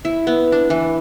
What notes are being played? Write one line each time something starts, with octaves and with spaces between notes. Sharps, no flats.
E4
B3
D4
E3